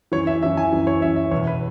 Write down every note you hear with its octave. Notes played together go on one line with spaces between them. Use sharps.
F#2 E3 C#5
E5
F#2 E3 E5
G#5
F#2 E3
C#5
F#2 E3 E5
E5
E2 B2 C#5
B4